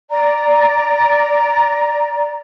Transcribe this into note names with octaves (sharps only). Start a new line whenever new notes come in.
D5 A#5